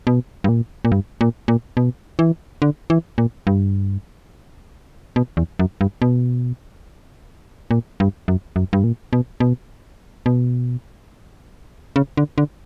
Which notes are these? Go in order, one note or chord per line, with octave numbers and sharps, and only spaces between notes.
B2
G2
A#2
A#2
G2
A#2
A#2
B2
E3
D3
E3
A#2
G2
B2
E2
F#2
G2
B2
A#2
G2
F#2
F#2
G2
A#2
B2
B2
B2
C#3
D3
D3